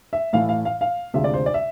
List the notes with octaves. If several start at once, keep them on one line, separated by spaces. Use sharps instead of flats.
E5
A2 E3 A3 E4 F5
F5
F5
F5
D2 C3 G#3 D4 F4 E5
D5
C5
D5
E5